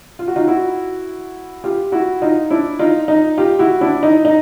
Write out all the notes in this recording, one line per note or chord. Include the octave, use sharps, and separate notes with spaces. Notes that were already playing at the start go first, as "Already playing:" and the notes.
F4
F#4
D#4 F4
E4 F#4
F4 G4
E4 F#4
D#4 F4
D4 E4
D#4 F4
D#4
F4 G4
E4 F#4
D4 E4
D#4
D#4